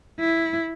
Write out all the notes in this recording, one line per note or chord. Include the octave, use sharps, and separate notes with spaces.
E4